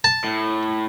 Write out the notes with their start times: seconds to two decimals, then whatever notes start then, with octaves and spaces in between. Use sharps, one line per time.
0.04 A5
0.24 A2